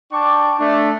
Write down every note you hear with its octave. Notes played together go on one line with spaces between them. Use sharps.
D4 G5 A5 C#6 D6
A3 D4